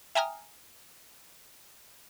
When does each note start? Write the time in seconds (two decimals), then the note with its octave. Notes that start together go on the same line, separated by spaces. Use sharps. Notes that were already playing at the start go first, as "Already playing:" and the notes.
0.15 E5 G5 G#5 A#5 D#6 F6